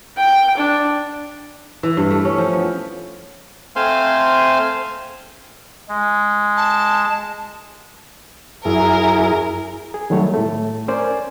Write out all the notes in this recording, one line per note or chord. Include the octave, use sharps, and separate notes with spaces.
G5
D4
E3
G2
A3
C#4
F3
B3
A3 C4 C5 F5 G#5 C6
G#3
A5
F#2 E4 G#4 A#4
G#4
D#3 F#3 G3 A3 C#5
A2 A3
C#4 A#4 C5 D5 G#5